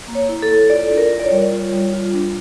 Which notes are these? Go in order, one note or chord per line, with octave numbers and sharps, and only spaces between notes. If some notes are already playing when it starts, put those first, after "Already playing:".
A#3
C#5
E4
A4
E4
F4 D5
D4
A#4
F4
D5
C#5
G3
F4
G3
F4
D4